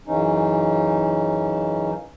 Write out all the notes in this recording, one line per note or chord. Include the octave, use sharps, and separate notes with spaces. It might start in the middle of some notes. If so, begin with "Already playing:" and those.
F#2 C#3 E3 C#4 D#4